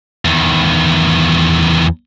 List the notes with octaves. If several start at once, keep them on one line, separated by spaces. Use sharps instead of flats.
E2 D#3